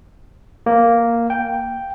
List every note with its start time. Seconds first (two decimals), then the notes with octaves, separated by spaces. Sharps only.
0.66 A#3
1.30 G5